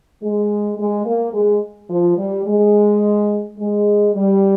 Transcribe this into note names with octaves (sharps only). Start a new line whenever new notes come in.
G#3
G#3
A#3
G#3
F3
G3
G#3
G#3
G3